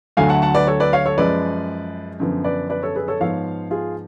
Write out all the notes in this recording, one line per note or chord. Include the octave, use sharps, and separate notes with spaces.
D2 D3 F#3 A3 F5 G#5
F#5 A5
F#5 A5
B4 D5
A4 C#5
B4 D5
C#5 F5
A4 C#5
F#2 F3 G#3 B4 D5
F#2 D3 F3 B3
B4 D5
B4 D5
A4 C#5
G#4 B4
A4 C#5
G#2 F3 B3 C#5 F5
F4 G#4